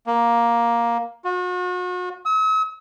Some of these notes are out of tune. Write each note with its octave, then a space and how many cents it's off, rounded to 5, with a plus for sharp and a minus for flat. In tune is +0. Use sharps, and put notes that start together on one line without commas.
A#3 +10
F#4 -40
E6 -45